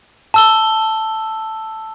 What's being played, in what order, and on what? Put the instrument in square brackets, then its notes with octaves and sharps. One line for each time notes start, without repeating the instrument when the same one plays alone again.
[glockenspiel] A5 E6 G7